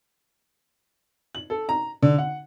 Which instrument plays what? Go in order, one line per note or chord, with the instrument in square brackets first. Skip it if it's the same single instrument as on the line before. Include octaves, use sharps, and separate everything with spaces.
[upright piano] F#7
A4
A#5
D3
F#5